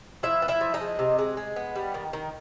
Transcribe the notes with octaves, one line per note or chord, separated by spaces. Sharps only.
F3 E4 E5
B3
E4 E5
F3
D#4 D#5
G#3
C3
G#3
G#3
B3
G3
D#3
D#3